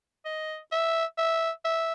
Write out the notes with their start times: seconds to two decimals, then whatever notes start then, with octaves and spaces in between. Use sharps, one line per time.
0.25 D#5
0.72 E5
1.18 E5
1.65 E5